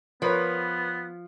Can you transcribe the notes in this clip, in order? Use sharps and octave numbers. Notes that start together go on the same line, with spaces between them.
F3 B3 A#4 B4 C#5